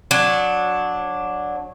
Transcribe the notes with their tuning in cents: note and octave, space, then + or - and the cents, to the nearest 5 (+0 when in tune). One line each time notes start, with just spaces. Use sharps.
F#3 -15 D4 +0